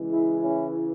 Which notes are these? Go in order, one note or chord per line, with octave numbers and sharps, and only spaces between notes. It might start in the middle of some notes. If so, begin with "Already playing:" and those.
Already playing: C#3 E3 G#3
E4 G#4
C#4 E4